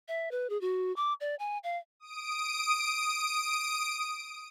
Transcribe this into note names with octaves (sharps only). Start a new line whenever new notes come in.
E5
B4
G#4
F#4
D6
D5
G#5
F5
D#6 D7